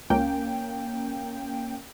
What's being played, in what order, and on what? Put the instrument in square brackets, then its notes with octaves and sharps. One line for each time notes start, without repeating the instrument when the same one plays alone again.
[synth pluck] C#2 [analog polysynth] A#3 C#4 G5